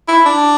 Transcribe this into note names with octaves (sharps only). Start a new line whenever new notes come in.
E4
D4